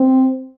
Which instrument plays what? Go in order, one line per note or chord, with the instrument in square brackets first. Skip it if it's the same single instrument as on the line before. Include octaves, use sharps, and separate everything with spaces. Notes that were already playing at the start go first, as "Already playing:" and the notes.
Already playing: [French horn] C4